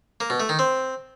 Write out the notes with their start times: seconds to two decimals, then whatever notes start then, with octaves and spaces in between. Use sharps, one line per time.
0.20 A#3
0.30 B2
0.40 A3
0.49 D#3
0.59 C4